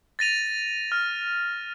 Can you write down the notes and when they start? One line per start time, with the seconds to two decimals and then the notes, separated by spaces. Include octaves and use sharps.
0.19 A6 A#6 D#7 F7
0.92 F6